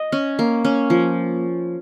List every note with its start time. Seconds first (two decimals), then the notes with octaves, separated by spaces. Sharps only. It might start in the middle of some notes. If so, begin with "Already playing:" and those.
Already playing: D#5
0.12 C#4
0.39 A#3
0.65 C#4
0.90 F3